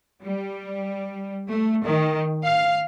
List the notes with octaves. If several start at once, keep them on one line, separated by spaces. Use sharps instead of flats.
G3
A3
D#3
F5